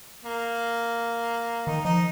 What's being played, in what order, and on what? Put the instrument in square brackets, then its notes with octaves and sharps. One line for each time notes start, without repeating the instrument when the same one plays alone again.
[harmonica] A#3
[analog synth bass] D#3 [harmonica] D#4
[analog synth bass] F3 [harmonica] D#4